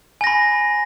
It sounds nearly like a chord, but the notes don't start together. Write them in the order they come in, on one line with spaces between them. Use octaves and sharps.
G#5 A#6 B5